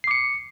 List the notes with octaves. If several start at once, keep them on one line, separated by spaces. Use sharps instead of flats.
D6 C7 C#7